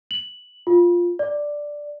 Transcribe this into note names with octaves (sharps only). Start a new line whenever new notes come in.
F#7
F4
D5